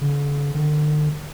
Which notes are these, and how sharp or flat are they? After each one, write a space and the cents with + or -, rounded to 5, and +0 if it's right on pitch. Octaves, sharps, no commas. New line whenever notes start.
D3 -45
D3 +40